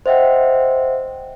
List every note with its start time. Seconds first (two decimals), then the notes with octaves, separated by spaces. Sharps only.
0.06 C5 D#5 E5 F#5 G5